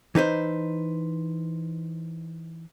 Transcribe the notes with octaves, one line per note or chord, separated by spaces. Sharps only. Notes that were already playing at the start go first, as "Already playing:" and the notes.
E3 D#4 B4 C5